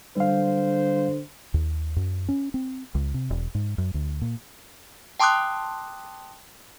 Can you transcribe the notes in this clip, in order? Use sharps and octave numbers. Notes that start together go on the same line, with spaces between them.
D3 G3 C5 F5
D#2
F#2
C#4
C4
C#2
C3
E1
G#2
F#2
D2
A#2
G5 A5 C6 D6 D#6 F#6